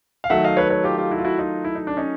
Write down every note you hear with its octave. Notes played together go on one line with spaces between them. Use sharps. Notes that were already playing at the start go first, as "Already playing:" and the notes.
F5
D#3 F#3 A3 E5 F#5
D#5 F5
B4 C#5
B4 C#5
F4 G4
F4 G4
E4 F#4
F4
E4 F#4
D#4 F4
E4
D#4
D4
C#4 D#4